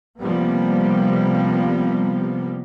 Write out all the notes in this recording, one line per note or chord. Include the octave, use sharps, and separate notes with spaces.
C3 F3 G3 A#3 B3